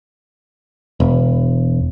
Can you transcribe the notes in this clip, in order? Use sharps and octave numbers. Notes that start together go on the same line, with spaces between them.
E1